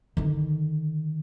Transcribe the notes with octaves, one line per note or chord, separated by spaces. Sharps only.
D3 D#3